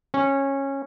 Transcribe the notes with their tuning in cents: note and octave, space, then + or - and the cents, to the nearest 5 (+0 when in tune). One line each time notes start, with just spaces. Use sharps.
C#4 -15